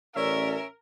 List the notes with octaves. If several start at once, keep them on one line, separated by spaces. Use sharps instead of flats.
A1 C#4 A#4 D5 E5